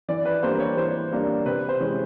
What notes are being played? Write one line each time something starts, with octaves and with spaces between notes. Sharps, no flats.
E3 D5
B4
G3 A#3 D4 C5
C#5
E3 C5
G3 A#3 D4
C3 B4
C5
E3 G#3 C#4